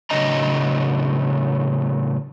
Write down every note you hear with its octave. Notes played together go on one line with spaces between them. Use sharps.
A2 C#3 F#3 D4 D#5 A#5